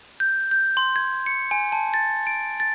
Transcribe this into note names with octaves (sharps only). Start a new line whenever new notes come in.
G6
G6
C6
G#6
C#7
G#5
A5
A6
D7
A6